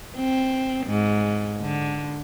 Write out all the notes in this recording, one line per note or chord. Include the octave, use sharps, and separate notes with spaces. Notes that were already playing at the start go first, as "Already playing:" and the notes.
C4
G#2
D3